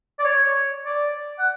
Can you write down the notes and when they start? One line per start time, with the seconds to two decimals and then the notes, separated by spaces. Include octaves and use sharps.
0.19 D5
0.25 C#5
0.86 D5
1.39 F#5